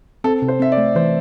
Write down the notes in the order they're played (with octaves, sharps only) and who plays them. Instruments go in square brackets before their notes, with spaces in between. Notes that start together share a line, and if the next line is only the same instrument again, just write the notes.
[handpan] C4 [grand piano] A4
[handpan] C3
[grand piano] C5
[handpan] C4 [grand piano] E5
[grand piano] D5
[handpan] A3
[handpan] E3 [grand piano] C5